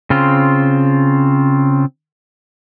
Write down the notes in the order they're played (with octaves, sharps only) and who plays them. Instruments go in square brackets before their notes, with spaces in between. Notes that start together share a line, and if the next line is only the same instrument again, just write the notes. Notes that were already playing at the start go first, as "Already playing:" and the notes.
[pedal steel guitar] C#3 C4 F4